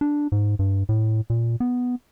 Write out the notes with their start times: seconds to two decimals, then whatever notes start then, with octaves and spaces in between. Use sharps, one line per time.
0.01 D4
0.32 G#2
0.59 G2
0.89 A2
1.30 A#2
1.60 B3